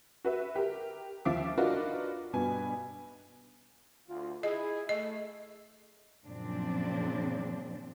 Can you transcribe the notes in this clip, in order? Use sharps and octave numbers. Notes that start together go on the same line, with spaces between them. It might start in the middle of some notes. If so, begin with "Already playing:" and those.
F#4 B4 E5
G4 A#4
D#2 F3 E5 F5 D6 D7
D4 D#4 F4 F#4 A#4 B4
G2 B2 B3 G#5
D2 F4
E4 G#4 D#5
A3 D#5
F#2 A#2 C#3 F3 C4 D4